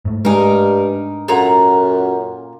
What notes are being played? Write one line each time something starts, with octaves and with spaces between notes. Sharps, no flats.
G#2 A3
G2 G#3 D4 D#4 A#4 G#5
F#2 A#2 A4 F#5 A#5